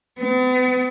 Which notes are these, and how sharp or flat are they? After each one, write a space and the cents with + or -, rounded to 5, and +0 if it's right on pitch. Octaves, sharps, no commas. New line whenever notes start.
B3 +45